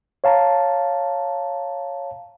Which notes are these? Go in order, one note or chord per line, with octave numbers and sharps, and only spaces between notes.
C#5 F5 A5 A#5